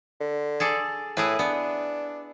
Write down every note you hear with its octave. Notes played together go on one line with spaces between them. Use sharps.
D3
G#4 A4 D5
A2 E4 G#4 B4
B3 D4